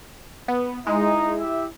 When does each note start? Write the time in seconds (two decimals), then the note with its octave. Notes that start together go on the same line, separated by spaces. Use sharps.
0.48 B3
0.87 G#3 D#4 E4
1.40 G4 E5